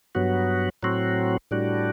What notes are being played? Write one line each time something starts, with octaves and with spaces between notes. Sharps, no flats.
G2 F#3 B3 F#4
A2 F#3 C4 F#4
A2 G3 D4 F#4